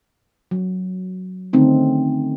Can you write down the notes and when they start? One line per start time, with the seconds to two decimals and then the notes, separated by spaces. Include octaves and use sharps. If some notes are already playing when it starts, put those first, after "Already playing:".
0.51 F#3
1.53 D3 D#3 A3 C4 C#4 D#4